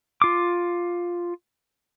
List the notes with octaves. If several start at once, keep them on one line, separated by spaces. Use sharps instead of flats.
F4 D6